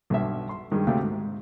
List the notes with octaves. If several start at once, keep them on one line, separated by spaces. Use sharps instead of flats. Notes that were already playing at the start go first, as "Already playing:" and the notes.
B1 G2 E5
C6
G2 D#3 G#3
D2 C3 A3 F5 G5
G#2